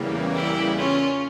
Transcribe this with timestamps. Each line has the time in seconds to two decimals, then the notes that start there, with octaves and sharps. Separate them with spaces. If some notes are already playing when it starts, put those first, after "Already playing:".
Already playing: E2 C#3 E3 G3 A#3
0.34 E4 G4
0.77 C#4 F4